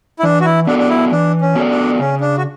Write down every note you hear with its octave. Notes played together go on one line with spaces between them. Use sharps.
E4
E3 D4
F#4
E4
B3 D4 F#4 A4 D5
D4
E4
E3 D4
C#4
B3 F#4 A4 D5
D4
C#3 C#4
D4
F#4